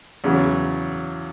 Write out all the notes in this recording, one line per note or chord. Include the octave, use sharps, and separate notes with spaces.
E2 C#3 F#3